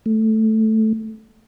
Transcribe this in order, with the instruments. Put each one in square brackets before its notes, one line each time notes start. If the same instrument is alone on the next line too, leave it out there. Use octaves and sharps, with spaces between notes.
[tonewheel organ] A3